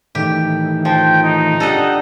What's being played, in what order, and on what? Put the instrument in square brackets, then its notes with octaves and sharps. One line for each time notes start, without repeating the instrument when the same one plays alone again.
[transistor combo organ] A2 D#3 E3 [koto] G4
[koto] F3 [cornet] G5
[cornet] D#4
[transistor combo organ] D4 G4 [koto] A4 D#5 F#5